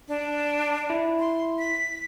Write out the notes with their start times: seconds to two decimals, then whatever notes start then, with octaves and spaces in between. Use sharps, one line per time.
0.08 D4
0.90 E4
1.20 C6
1.59 B6